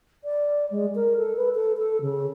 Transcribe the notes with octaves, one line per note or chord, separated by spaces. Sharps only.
D5
G#3
A#4
A4
B4
A4
A4
C#3